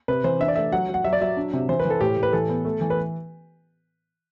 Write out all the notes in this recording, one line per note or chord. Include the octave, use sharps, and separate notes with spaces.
C3 B4
E3 C5
D4 E5
D5
A3 E5
F#3 F#5
F#3
F#5
F#3 E5
D5
F#3 E5
D4
C3
E3 C5
B4
E3 A4
A2 G4
A2
B4
E3 A4
B3
A3
E3
B4